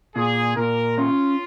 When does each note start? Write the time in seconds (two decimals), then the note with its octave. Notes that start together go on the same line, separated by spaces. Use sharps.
0.15 A#2 G#4
0.56 A#2 A#4
0.97 C#4 F4